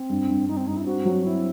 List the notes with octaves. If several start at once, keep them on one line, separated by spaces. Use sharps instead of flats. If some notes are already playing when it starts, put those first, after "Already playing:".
Already playing: C4
G2
G2
G2 D#4
C4
G2 D#4
E4
C4 F#4
F#3
C4 E4